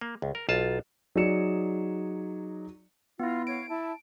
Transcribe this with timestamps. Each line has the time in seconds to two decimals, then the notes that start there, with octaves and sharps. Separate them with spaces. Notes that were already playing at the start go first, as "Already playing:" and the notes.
0.01 A#3
0.22 C#2
0.35 A#4
0.49 B1 F4 A5
1.15 F#3 D#4 G#4 D5 C#7 E7
3.19 B3 E4 F4
3.47 C#5 F5 D7
3.68 E4 A5